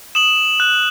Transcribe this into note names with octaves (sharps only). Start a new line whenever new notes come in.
D#6 E7 F#7
F#6